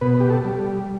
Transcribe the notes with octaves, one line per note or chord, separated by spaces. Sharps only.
B2 B4
G4
A4
G3